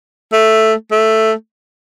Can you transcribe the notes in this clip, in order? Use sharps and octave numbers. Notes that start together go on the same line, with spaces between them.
A3
A3